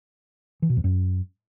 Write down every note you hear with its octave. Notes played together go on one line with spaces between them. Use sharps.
E3
B2
E2
F#2